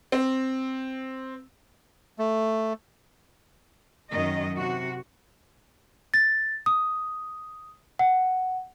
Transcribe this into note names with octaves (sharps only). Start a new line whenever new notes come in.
C4
A3
F#2 D#3 D#5
C3 F#4
A6
D#6
F#5